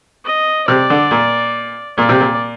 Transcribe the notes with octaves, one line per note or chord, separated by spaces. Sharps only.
D#5
C3 D5
D3
A#2
A#2 D5
C3
A#2